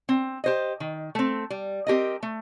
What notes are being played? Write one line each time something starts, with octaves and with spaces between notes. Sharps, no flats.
C4
G4 C5 D#5
D#3
A3 C4
G3
C4 G4 A#4 D#5
A3